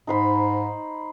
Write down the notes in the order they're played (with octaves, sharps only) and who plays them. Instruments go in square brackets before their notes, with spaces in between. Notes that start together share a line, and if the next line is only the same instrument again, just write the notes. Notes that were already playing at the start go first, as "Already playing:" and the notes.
[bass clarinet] G#2 [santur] D#4 C5 B5